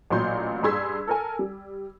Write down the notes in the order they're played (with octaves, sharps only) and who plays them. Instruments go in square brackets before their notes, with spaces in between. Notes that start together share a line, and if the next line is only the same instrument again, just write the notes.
[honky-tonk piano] A1 A#2 F#3 C6 G6
G2 G#4 C6 E6 G#6 B6
A4 A#4 G#5
G3